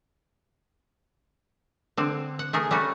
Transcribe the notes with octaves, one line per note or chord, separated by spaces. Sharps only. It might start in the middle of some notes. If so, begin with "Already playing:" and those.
D3 C4
F#5
A3 G#4 A#4
G3 A3 C#4 F#4